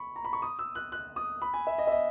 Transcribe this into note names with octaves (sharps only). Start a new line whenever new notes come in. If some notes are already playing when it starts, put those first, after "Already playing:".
Already playing: B5 C#6
A#5
B5
C#6
D#6
E6
F#6
F#6
D#6
B5
G#5
E5
D#5
E5
D#5